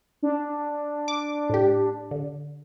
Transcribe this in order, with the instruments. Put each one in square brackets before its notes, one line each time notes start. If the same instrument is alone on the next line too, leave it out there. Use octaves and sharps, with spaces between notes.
[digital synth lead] D4
[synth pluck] D6
A2 G4
D3